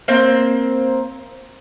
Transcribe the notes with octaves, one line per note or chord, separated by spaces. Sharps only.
A#3 C4 C5